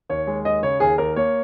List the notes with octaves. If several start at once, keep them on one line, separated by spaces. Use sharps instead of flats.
D#2 C#5
G#3
D#2 D#5
C#3 C#5
D#2 G#4
D#2 A#4
A#3 C#5